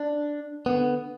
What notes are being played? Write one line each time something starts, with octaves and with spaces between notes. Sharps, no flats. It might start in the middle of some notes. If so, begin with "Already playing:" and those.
Already playing: D4
D3 B3